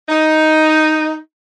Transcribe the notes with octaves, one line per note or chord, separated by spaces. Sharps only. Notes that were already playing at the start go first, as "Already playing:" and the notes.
D#4